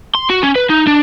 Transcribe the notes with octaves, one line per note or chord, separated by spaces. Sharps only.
C6
F#4
C#4
B4
D#4
D4